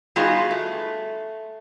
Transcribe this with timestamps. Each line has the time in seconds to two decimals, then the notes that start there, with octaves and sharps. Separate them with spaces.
0.16 G3 B3 D#4 F4 F#4 G#4
0.51 A3